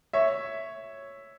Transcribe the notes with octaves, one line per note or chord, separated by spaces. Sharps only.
C#5 E5